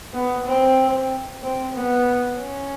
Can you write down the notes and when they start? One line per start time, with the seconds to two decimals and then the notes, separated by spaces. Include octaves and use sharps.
0.14 B3
0.46 C4
1.43 C4
1.74 B3
2.39 C#4